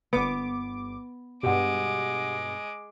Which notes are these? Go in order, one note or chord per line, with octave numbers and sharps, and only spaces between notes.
G1 B3 D6
G2 B2 G#3 G4 F#5 D6